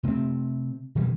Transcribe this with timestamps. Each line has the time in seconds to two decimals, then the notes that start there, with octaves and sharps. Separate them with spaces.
0.03 C3 A3 A#3 C4
0.95 B2 D#3 E3 G3